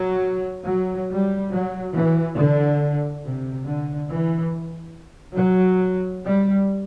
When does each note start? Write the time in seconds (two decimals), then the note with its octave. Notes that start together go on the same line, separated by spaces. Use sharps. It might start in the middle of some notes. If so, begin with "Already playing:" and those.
Already playing: F#3
0.67 F#3
1.10 G3
1.52 F#3
1.95 E3
2.37 D3
3.24 C3
3.66 D3
4.10 E3
5.37 F#3
6.24 G3